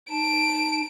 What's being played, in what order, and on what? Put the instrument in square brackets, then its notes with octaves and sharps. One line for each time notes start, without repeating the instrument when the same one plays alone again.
[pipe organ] D#4 A5 [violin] D7